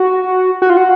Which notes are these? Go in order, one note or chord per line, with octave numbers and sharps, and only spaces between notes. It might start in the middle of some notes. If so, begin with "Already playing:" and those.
Already playing: F#4
F#4
F4
F#4